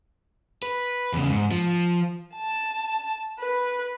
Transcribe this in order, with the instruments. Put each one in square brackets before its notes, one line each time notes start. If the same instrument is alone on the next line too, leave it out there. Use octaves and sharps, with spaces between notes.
[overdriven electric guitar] B4
E2 C#3
G#2
F3
[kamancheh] A5
B4